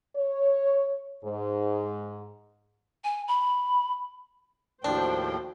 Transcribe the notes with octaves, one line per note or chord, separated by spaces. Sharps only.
C#5
G#2
G#5
B5
D#2 A2 F3 D4 F#4 C5 G5